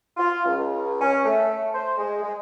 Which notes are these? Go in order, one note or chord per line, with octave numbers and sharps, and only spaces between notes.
F4
C#2
C#4
A3
C5
G#3
G#3